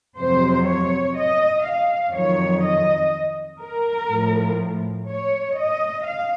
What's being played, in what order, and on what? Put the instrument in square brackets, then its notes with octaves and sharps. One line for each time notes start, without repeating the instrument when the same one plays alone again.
[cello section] F2 C3 F#3 C5
C#5
D#5
F5
F2 D#3 F#3 C#5
D#5
A#4
A2 F3
C#5
D#5
F5